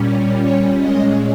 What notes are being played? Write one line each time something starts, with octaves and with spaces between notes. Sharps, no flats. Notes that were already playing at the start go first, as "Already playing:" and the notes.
Already playing: A#2 G3 C#4
C#5
A#2 G#3 C#4 D#5